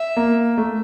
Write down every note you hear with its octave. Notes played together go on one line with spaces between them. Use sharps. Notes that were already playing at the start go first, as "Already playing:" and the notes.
Already playing: E5
A#3
A3